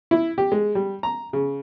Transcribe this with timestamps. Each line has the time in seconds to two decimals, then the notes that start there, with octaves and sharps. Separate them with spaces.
0.11 E4
0.38 G4
0.52 G#3
0.75 G3
1.03 A#5
1.33 C#3